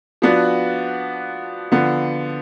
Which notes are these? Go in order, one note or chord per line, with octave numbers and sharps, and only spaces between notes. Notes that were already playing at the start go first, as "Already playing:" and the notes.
F3 B3 D4 F#4
D3 F3 B3